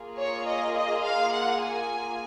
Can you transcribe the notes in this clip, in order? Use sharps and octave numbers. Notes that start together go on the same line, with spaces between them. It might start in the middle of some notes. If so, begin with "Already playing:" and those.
Already playing: A#3 F4 G#4
C#5
D#5
D#5
F5
F#5
G#5